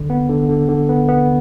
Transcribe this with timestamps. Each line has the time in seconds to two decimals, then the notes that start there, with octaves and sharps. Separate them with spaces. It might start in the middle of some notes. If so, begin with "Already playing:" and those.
Already playing: D3
0.10 B3
0.29 D3
0.49 D3
0.69 D3
0.89 B3
1.09 B3